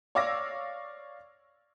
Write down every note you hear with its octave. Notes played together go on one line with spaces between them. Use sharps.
C#5 D5 F5 D6 E6 A#6